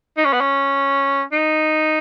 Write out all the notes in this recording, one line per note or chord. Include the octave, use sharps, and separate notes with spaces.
D#4
C#4
B3
C#4
D#4